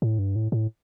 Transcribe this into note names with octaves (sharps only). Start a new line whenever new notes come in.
A2
G2
A2
A2